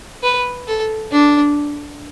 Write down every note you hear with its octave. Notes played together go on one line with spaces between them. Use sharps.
B4
A4
D4